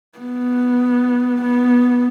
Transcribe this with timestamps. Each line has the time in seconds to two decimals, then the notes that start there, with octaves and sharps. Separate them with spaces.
0.19 B3
1.41 B3